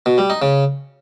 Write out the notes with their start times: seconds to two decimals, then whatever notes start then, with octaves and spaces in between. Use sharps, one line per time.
0.06 B2
0.18 G3
0.30 D#4
0.42 C#3